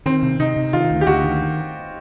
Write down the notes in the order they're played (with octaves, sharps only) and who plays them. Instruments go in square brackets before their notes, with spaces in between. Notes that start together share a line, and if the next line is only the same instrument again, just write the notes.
[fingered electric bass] D#3 [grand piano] C4
[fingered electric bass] C3
[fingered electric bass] C3 [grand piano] D#4
[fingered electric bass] C3
[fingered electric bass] D#3 [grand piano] F4
[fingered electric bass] D2
[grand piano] G4
[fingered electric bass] D2 [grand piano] F#4
[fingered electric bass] D#3